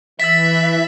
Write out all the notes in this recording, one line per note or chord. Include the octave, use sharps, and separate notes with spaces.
E3 E5 E6 A6 B6